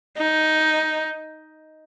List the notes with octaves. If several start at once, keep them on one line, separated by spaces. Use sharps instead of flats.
D#4